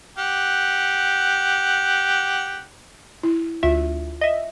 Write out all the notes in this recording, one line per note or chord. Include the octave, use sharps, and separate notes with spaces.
G4 F#5
E4
D2 F4 E5
D#5 E5